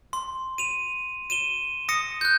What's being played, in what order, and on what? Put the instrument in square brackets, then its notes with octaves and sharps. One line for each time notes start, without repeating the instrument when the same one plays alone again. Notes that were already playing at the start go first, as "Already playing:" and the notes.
[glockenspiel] C6
D#7 F7
D#7 E7 G7
D#6 A#6 C#7
F#6 G6